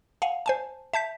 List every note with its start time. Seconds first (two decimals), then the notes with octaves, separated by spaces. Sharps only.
0.22 F5 F#5 G#5
0.46 C5 G#5 A5
0.93 E5 A5 G6 B6